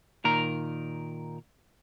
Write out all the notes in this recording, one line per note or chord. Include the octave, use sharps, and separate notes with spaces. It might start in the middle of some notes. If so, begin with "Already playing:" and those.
A#2 D#3 A#4 A#5